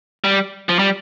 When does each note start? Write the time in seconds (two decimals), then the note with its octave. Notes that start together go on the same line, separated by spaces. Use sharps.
0.24 G3
0.69 F3
0.79 G3